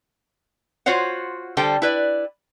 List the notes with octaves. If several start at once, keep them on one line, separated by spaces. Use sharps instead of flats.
F4 F#4 C5 C#5 F#5
D3 G3 A4 C5 G5
E4 B4 D5